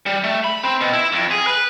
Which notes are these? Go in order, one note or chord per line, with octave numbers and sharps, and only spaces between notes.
G3
A3
B5
C4
B2
E4
F2
G#4
B4